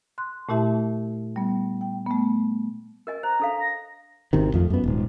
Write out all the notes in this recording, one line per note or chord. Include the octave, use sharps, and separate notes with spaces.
C6 F#6
A#2 A3 E4 G4 E5 A5
G3 B3
G5
A3 B3
A#4 D#5 G#5
C5 A#5
D4 A4 F5
A#6
G#1 C3 D#3
F2 F3 A3
F#2 B3
D#1 G#2